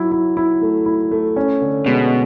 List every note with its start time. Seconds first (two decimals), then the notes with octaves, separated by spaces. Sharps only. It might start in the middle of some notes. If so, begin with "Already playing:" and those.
Already playing: F#3 E4
0.12 E4
0.37 E4
0.62 A3
0.86 E4
1.11 A3
1.36 C#4
1.62 D3
1.86 B2 G#3